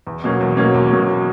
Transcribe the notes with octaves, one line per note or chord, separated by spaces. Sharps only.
E2
B2 F#3 A#3 C#4
E2
B2 F#3 A#3 C#4
E2
B2 F#3 A#3 C#4